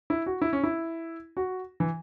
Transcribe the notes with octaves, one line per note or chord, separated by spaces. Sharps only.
E4
F#4
E4
C#4
E4
F#4
E3